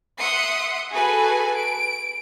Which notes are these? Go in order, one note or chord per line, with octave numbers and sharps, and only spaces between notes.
E5 F#5 C6 D#6 C#7
F#4 G#4 A4 B4 G#5
D7